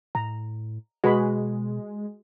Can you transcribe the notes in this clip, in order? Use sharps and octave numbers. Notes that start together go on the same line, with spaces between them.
A2 A#5
B2 G#3 F#4 B4 B5